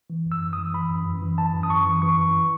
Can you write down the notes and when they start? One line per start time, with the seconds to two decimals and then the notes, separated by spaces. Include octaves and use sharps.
0.10 E3
0.26 F#2
0.32 E6
0.42 F#2
0.53 D#6
0.58 E3
0.74 E3 B5
0.90 F#2
1.06 F#2
1.22 E3
1.38 E3 A5
1.54 F#2
1.63 D#6
1.70 F#2 C#6
1.87 E3
2.02 E3 C#6
2.18 F#2